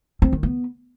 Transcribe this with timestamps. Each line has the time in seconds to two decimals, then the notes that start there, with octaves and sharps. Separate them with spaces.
0.22 C4
0.32 D#3
0.43 B3